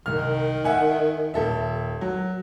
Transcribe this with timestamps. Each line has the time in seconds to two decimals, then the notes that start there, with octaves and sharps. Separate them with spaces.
0.06 C2 D#3 F6
0.64 E5 F#5 G#5
1.34 D#1 A4 E5
2.01 F#3